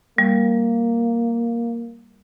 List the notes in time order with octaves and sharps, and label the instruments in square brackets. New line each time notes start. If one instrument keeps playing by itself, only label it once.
[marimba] G3 [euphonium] A#3